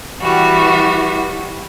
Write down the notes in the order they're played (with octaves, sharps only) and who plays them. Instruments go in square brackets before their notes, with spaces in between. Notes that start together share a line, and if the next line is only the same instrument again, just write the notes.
[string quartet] E3 G3 F#4